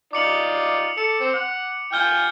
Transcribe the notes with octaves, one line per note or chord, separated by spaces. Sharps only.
D#4 F4 D5 D6 C#7 F#7
A4 C#7
C4 C5
F#5
F4 G5 G#5 F6 G6 G7